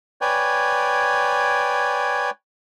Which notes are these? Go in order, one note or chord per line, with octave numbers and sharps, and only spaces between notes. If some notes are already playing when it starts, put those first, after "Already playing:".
B4 C#5 D5 G5 G#5